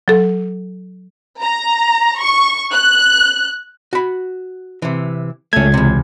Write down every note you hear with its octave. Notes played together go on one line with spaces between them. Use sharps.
F#3 A4
A#5
C#6
F#6
F#4 B5
C3 E3
C#2 A3 C#4 G#6
E2 C3